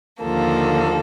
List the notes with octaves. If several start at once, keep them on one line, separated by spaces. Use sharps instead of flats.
D#2 D3 F3 A#3 A4